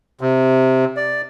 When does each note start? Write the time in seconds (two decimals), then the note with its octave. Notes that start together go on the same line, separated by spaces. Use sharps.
0.21 C3
0.97 D5